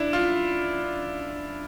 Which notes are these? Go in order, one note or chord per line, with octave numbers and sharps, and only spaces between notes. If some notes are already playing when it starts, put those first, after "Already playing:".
Already playing: D4 E4
F4